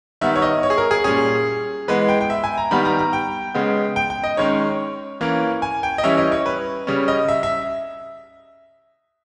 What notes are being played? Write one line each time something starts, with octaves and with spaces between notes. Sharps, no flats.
D#3 G3 B3 E5
C#5
D#5
C#5
G#4
A#4
G#4
A#2 G3 C#4 G#4
E3 G#3 B3 B4
G5
G5
E5
G#5
A#5
D#3 G3 B3 B5
A#5
A#5
G5
C#3 G#3 B3
G5
G5
D#5
D#3 G#3 C#4 C#5
E3 A#3 C#4
G#5
G5
D#5
E3 G3 C#4 E5
D#5
C#5
B4
C#3 G3 C#4
D#5
E5
E5